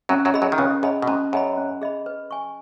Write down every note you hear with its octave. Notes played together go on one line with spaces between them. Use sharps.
F#2 F#3 C#4
F#2 F#3
G#4 D#5 B5
F#2 F#3
D#3
C#2 C#3 C#4
F#2 G#4 D#5 B5
B2
G#2 C#4
F#2 G#4 D#5 B5
C#4
G#4 D#5 B5
B4
G#5 C#6